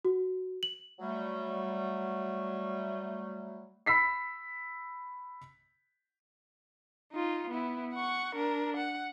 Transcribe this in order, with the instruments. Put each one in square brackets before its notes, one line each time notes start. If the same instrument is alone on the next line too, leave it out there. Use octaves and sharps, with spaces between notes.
[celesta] F#4
F#7
[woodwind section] F#3 G3 A3
[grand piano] B5 E6 B6 C7
[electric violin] D#4 F4
B3 E4
F#5 C#6
D4 A#4
F#5